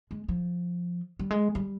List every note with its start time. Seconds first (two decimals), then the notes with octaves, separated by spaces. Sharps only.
0.11 G#3
0.28 F3
1.19 G3
1.31 G#3
1.55 G3